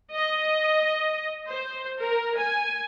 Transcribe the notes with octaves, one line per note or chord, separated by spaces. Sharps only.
D#5
C5
A#4
G#5